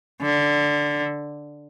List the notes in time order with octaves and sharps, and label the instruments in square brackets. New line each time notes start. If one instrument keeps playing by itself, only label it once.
[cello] D3